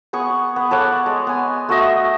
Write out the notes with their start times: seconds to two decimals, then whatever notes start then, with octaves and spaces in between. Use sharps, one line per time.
0.13 B3 G#4 C#6
0.56 B3
0.71 A4 C#5 D5 F#5
1.06 G#3
1.27 B3 G#5
1.69 A3 F#4 D#5 E5